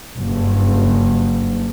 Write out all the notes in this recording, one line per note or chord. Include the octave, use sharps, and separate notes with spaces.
F#1 G2